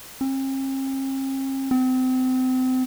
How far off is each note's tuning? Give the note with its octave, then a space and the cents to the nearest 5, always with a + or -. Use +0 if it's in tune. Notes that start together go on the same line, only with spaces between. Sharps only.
C4 +45
C4 -30